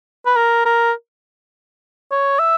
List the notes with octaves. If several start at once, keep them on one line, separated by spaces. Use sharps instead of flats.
B4
A#4
A#4
C#5
E5